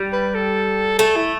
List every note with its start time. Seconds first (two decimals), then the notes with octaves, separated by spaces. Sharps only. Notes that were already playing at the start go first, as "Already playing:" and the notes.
Already playing: G3
0.13 B4
0.35 A4
0.99 A3 A4
1.16 E4